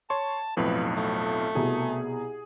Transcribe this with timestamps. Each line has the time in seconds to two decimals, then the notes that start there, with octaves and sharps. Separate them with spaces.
0.10 C#5 A5 C6 C#6
0.57 B1 F2 A2 B4
0.97 A3
1.55 C2 B2 G#4